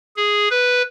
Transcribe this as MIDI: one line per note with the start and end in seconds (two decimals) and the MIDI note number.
0.16 0.48 68
0.51 0.82 71